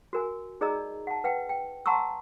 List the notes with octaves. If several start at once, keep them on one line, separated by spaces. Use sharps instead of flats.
F#4 A#4 G#5
D#4 G#4 D5 D#5 A#5 E6
F#5 A5
B4 F#5 G5
G5
F#5 A5 A#5 C6 C#6 E6